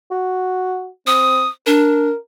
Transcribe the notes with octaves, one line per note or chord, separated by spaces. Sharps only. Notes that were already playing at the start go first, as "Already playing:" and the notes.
F#4
C4 D#6
D4 A#4